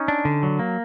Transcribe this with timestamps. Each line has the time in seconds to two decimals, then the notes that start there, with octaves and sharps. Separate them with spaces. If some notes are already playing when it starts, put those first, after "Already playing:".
Already playing: C#4 D#4
0.08 D4
0.25 D3
0.43 F#3
0.59 A#3